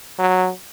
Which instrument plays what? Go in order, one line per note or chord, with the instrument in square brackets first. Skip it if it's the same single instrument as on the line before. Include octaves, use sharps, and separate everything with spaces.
[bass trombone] F#3